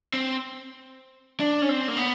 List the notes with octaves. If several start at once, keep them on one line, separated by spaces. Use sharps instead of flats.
C4
D4
C#4
C4
A#3
B3